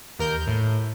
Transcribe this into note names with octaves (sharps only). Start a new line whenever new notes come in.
D#2 A#4 G6
A2